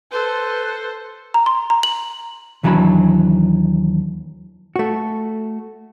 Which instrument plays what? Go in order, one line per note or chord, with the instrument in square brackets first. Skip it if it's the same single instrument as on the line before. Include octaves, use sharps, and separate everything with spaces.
[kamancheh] A4 C5 [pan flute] B4
[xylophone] A#5
C6
A#5
F#7
[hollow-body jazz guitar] D#2 E3 F#3 D4 D#5 B5
A3 F#4